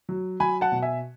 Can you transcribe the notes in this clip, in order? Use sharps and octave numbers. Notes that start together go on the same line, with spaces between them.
F#3
F#3 G#5 B5
F#5 A5
B2
E5 G#5